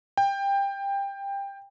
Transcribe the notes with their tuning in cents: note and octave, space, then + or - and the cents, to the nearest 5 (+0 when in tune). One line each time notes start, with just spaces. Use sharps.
G5 +20